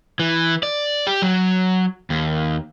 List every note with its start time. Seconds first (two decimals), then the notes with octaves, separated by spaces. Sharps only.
0.19 E3
0.63 D5
1.07 G4
1.22 F#3
2.10 D#2